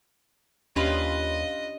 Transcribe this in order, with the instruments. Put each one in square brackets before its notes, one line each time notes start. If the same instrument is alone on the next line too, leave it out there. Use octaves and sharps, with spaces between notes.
[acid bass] D#2 [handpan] C#4 D4 G4 [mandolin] F4 B4 [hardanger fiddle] D#5